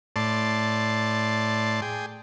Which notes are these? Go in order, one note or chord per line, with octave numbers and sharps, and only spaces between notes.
A2 D5 A5 C6
G#4 G5